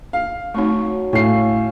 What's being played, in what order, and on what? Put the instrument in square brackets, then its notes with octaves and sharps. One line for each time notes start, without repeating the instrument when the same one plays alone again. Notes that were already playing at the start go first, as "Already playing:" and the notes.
[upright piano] F5
[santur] F#3 C#6 [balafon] A3 C4 D#4
[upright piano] A2 C7 [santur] C#4 F5